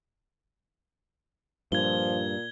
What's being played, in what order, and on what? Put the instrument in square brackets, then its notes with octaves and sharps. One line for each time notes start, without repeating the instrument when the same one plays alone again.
[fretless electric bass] G2 [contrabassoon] A#2 [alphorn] F3 [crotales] G#6 G7